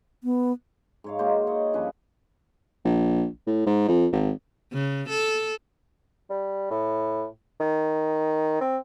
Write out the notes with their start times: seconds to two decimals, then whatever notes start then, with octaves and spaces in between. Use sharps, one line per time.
0.24 B3
1.04 G#2 C#5 F5
1.19 G#3 A#3 F#4 C5
1.47 C#5 D#5
1.73 G2 F3 C#4 B4
2.85 A#1
3.47 A2
3.67 G#2
3.88 F2
4.12 G#1
4.73 C#3
5.09 A4
6.30 G3
6.71 A2
7.60 D#3
8.61 C4